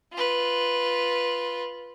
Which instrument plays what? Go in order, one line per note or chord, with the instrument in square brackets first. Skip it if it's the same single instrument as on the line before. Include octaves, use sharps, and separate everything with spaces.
[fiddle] F4 B4